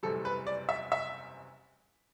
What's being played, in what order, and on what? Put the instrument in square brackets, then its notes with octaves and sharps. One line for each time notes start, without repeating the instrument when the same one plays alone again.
[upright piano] F#1 E2 C3 G3 A4
B4
D5
E5
E5